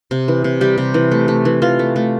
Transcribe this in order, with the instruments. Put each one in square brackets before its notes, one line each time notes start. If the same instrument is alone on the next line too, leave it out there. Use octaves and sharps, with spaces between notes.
[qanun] C3
E3
C3
G3 G4
C3
E3
A3
A3
E3
E3 F4
A3
A3